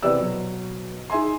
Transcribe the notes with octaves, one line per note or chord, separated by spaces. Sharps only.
C3 E3 B3 G4 D5 E6
B2 F#3
D#4 G#4 E5 G#5 C6